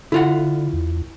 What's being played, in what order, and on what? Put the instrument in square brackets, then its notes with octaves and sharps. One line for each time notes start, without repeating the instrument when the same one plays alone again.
[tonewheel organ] D3 [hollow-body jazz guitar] E4 F4 F#5
[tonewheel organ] E2